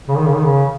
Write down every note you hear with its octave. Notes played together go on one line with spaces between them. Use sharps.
C#3
D#3
C#3
D#3
C#3